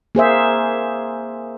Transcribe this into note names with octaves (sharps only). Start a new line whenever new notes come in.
A#3 G#4 C5 E5